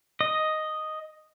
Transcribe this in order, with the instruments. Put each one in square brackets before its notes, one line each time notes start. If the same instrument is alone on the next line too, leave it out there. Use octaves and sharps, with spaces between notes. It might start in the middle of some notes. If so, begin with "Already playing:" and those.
[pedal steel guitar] D#5